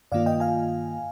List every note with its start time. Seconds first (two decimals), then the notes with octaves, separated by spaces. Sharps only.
0.12 G2 D#3 A#3 F4 D5 F5
0.26 D#5 G5
0.40 F5 G#5